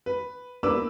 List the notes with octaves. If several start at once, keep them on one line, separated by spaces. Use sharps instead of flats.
B4
E2 A#3 D4 B4 D6 E6